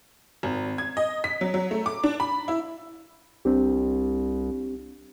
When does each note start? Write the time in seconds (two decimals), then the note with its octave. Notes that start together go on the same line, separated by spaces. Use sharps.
0.43 G#1
0.78 G#6
0.97 D#5
1.24 B6
1.41 F#3
1.54 F#3
1.71 A3
1.86 D6
2.04 D4
2.20 B5
2.48 E4
3.45 C2 C4 D4 G4